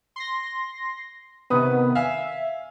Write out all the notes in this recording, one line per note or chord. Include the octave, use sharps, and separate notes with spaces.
C6 A#6
C3 D#3 B3 B4 D#6
E5 F5 G#5